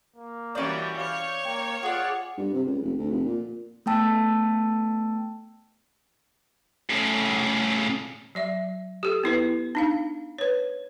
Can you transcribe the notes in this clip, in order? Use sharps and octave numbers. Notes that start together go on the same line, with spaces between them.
A#3
E3 G3 C#4 F#4 D5 G6
C#5 F5 C#6
A#3 G5
F4 G#4 D5 F#5
G2
C3
C#2
F1
D2
F1
A#2
A3 B3 G5 A5 E6
A2 C#3
F#3 D5 E5
G4 A4
B3 E4 B4
D4 D#4 F5
B4 C#5